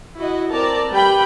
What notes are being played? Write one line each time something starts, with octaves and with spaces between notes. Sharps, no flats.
E4 F#4 D#5
C4 A#4 D5 A5 A#5
G3 B4 G5 B5